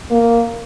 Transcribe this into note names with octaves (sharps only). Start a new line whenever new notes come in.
A#3